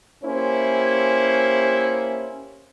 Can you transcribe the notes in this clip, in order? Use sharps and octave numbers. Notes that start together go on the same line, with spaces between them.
A#3 C#4 E4 G4 C5